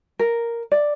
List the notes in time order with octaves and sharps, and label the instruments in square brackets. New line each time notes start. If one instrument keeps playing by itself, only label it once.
[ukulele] A#4
D5